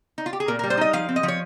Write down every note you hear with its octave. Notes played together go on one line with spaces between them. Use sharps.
D#4
F4
G4
G#4
A#2 A#4
G3 A#4
C5
D#4 D#5
F3 F5
C4
D#5
F3
C#5